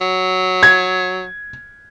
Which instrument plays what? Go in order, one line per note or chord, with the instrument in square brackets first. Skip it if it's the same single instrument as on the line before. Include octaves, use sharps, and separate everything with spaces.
[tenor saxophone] F#3
[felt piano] G#6